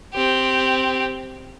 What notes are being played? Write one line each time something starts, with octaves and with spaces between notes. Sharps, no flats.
C4 G4